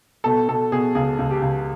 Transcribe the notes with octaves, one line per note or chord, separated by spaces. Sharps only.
B2 A4
B2 A4
B2 G#4
C#2 G#4
C#2
G4
C#2